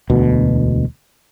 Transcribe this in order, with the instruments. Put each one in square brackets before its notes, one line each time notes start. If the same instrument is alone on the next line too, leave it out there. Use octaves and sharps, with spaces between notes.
[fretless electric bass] E1 D2 B2